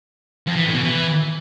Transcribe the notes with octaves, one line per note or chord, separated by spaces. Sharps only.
F2
E3
A2
B2
E3